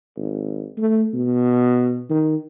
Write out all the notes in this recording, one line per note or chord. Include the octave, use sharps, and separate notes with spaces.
G#1
A3
B2
D#3